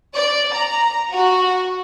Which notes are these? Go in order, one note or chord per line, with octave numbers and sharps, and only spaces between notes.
D5
A#5
F#4